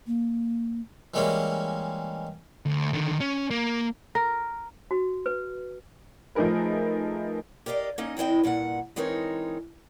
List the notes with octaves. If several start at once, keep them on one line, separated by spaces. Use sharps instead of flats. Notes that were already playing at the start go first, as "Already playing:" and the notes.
A#3
E3 G3 G#3 A#3 C#4
D2
D3 D#3
C#4
A#3
A#4
F#4
B4
F3 A3 D#4 G#4 A#4 B4
G4 A#4 D5 D#5 F5
A#3 C#4 D#4 D#5
E2 C4 E4 D#5 G5
G2 A#2 B4 F#5
E3 G#3 C4 D#4 A#4 C#5